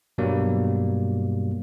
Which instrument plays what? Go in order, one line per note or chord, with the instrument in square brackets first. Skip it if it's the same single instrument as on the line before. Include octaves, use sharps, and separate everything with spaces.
[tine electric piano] G2 B2 F#3 G3 A#3